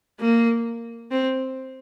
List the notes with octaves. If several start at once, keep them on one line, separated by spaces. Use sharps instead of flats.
A#3
C4